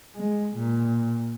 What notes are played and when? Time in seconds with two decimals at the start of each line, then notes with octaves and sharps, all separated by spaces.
0.16 G#3
0.56 A#2